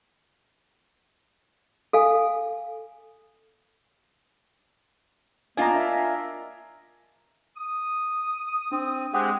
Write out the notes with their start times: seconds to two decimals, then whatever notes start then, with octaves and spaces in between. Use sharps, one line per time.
1.93 A4 F5 G#5
5.57 A#3 B3 D4 F4 D#5 G#5 A#5
5.74 A#4 D#5 E5
7.57 D#6
8.72 C4 D4
9.14 G#3 C4 G4 G#4 F#5 D#6 F#6